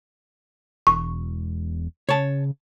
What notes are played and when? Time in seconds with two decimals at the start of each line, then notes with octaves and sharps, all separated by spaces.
0.87 E1 C#6
2.09 C#3 C#5 A5